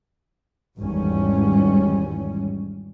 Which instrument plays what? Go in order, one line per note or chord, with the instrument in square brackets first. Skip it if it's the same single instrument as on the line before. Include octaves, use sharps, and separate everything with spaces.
[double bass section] G#1 E2 G#2 E3 G3 C#4